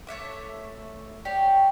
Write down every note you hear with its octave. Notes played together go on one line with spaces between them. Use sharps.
A3 C#5 E5 D6
G4 C#5 D5